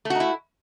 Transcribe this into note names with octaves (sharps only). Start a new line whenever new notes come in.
A3 D#4 E4 F#4